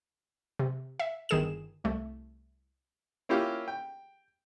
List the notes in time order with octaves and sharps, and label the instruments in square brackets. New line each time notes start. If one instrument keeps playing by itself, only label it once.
[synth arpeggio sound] C3
E5
G1 D#3 G#4 E7
C2 A3
[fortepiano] A#3 C#4 E4 F4 G4
G5